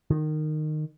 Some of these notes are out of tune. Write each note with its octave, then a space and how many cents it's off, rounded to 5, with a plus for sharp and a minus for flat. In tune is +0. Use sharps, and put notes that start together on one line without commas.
D#3 -20